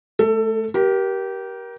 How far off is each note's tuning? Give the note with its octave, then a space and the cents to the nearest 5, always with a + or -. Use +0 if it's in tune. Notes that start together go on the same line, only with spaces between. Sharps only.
A3 -20 A4 +20
G4 -20 A#4 +25